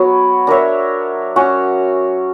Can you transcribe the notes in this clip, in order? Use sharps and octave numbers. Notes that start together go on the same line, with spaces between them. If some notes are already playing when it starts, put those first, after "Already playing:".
Already playing: F#3 B3 F#4 C#5
D4 A#4 C#5 E5
C#4 F#4 C#5